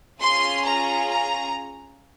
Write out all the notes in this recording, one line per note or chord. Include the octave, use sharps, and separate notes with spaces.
C#4 F4 G#4 C6
A#5
A#5